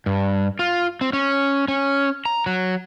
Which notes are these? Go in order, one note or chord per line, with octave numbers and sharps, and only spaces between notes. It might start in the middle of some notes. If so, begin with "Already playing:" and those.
G2
F4
C4
C#4
C#4
A#5
F#3